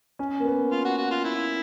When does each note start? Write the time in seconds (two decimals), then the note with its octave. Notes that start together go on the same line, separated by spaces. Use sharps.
0.19 C#4
0.40 A#3
0.45 B3
0.72 F4
0.85 F#4
0.98 F#4
1.11 F4
1.24 E4